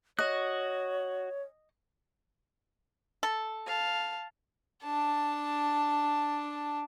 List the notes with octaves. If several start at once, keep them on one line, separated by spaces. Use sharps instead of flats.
F#4 C#5 D#5 F#6
A4
F5 A5
D4 A5